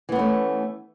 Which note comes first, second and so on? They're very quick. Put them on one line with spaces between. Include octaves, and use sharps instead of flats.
E3 B3 C#4 A3